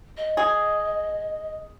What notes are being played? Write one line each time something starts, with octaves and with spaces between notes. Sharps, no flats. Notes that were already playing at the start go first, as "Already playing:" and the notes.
D#5
G#4